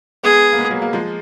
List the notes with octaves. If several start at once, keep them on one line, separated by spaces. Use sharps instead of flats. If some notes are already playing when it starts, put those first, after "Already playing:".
G#3 B3 G#4
A#3
G#3 B3
F#3 A#3
F#3 A#3
F3 G#3